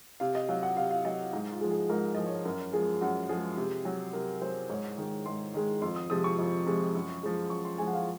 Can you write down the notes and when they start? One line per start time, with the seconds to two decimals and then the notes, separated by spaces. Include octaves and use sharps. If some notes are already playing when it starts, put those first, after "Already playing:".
0.20 C3 F5
0.35 D#5
0.48 F#3 F5
0.63 F#5
0.77 C3 F5
0.91 F5
1.05 F#3 D#5
1.33 G#2 D#4
1.52 F4
1.61 F3 G#3
1.70 G#4
1.89 G#2 A#4
2.15 F3 G#3 D#5
2.27 C#5
2.45 F#2 A#4
2.73 F3 G#3 G#4
3.01 F#2 F#4
3.29 F3 G#3 G#4
3.57 C3
3.85 F#3
4.13 C3 A#4
4.42 F#3 C5
4.70 G#2 C#5
4.98 D#3 G#3
5.26 G#2 C6
5.54 D#3 G#3
5.82 F2 C6
5.96 D#6
6.10 C3 F3 G#3 D#6
6.24 C#6
6.38 F2
6.66 C3 F3 G#3
6.95 F#2
7.23 F3 G#3
7.50 F#2 C#6
7.65 C6
7.78 F3 G#3 G#5
7.87 F#5
7.93 F5